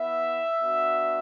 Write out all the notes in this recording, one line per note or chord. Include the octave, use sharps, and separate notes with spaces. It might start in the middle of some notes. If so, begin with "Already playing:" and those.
Already playing: B3 E4 E5
B3 D4 F#4